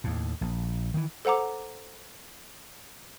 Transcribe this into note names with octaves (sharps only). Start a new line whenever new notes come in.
D#2 A2
A#1
D#3 E3
A4 C5 F#5 A#5 D6